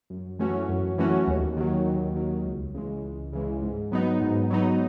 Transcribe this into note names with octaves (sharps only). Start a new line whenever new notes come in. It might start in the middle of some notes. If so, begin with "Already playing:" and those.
F#2
E3 A3 C#4 F#4
F#2
E3 A3 C#4 F#4
D#2
D#3 F#3
D#2
D#3 F#3
C#2
C#3 E3 G#3
C#2
C#3 E3 G#3
G#2
F#3 B3 D#4
G#2
F#3 B3 D#4